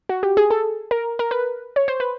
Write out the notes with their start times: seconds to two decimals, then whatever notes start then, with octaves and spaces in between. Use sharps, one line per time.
0.09 F#4
0.23 G4
0.37 G#4
0.50 A4
0.91 A#4
1.19 A#4
1.31 B4
1.76 C#5
1.88 C5
2.00 B4